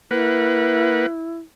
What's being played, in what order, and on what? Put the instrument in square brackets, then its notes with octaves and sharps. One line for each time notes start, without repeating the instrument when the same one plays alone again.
[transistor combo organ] A#3 B4 F#5 [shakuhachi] E4